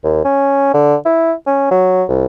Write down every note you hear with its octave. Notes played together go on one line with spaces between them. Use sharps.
D#2
C#4
D3
E4
C#4
F#3
C2